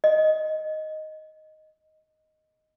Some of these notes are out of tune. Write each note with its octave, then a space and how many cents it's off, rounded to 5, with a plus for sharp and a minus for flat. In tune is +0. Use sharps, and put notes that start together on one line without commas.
D#5 +0